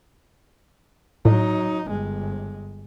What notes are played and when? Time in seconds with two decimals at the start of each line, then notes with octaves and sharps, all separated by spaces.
1.25 A2 F#3 D#4
1.87 G1 G#3